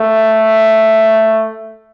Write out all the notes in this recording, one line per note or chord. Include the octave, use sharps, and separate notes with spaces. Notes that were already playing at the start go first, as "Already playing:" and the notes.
Already playing: A3